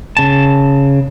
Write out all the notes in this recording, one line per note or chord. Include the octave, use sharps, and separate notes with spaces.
C#3 A5